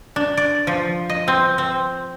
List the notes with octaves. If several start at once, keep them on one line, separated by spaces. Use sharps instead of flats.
D4
D5
F3
D#5
C4
C4